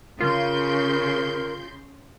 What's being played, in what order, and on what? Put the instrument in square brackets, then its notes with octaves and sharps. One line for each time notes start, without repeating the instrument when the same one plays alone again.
[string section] C#3 C6 G6 [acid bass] F4 [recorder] A#4